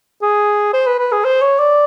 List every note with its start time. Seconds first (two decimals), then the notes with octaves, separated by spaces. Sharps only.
0.22 G#4
0.73 C5
0.87 B4
0.99 B4
1.12 G#4
1.24 C5
1.42 C#5
1.59 D5